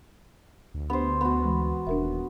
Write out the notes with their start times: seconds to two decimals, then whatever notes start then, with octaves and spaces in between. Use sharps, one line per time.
0.74 D2
0.90 B3 D4 G4 C5
1.21 B3 F#4
1.43 E3 G#3
1.87 D#1 D4 A#4 E5